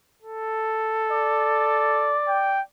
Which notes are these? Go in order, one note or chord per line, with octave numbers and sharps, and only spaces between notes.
A4
D5
G5